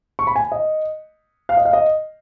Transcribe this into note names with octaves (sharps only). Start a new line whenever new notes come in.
C#6
B5
G#5
D#5
F5
D#5
F5
D#5